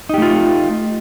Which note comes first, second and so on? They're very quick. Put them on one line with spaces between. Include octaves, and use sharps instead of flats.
D#4 G4 A3 F4